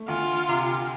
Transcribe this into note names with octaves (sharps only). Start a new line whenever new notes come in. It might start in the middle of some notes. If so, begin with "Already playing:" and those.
Already playing: A3
D2 F4
C3